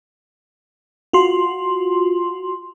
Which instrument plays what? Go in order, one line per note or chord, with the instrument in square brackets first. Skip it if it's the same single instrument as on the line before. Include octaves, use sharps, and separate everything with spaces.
[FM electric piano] F4 F#4 C6